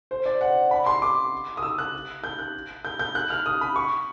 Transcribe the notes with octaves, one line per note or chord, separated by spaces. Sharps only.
C5
D5
F#5
B5
C6
D6
D#6
E6
F#6
G6
F#6
G6
G6
F#6
F6
D#6
B5
C#6